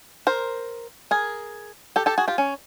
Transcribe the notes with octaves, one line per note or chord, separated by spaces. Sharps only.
A#4 C5
G#4 A#4
G4 A4
G4 A4
F#4 G#4
F4 G4
C#4